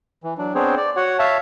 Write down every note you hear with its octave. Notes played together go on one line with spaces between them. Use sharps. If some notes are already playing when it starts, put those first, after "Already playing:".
E3
F#3 D4
B3 C4 D4 G#4 C5 C#5
D5
F#4 C#5 F#5
C#5 E5 F5 A5